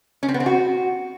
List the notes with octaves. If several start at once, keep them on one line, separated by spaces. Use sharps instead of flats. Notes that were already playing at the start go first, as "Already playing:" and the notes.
C#4
C4
B3
C4
F#4